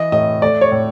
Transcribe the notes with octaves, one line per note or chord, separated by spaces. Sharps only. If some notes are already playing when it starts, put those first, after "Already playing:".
Already playing: E3 D#5
A2 D#5
A3 D5
C#5
A2